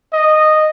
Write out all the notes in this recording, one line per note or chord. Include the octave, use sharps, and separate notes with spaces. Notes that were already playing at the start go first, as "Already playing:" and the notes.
D#5